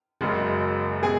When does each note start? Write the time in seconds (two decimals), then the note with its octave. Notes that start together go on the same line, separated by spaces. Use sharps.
0.21 F#1 F#2 C#3 G#3
1.02 B2 G#3 G#4 G#5